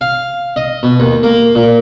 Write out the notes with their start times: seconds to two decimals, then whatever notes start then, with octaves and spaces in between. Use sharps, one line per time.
0.01 F5
0.56 D#5
0.83 B2
1.00 D#2
1.23 A#3
1.55 A#2